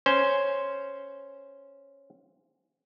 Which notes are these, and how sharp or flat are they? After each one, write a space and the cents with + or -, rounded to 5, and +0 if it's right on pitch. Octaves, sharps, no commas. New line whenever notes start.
C#4 +0 C5 +0